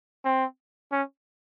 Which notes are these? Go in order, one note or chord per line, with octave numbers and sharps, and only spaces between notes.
C4
C#4